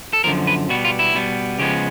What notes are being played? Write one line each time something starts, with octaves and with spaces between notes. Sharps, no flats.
A4
F#2 D3 F3 A#4
B4
B2 G3 B3 F#4
F4
E4
B2 G3 B3
C#3 F3 G#3 B3 G4